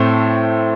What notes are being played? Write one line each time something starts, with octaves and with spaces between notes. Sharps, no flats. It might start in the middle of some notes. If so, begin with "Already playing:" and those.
Already playing: A2 A3 C4